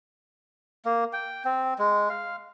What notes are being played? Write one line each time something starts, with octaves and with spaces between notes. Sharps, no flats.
A#3
G5
C4
G#3
F5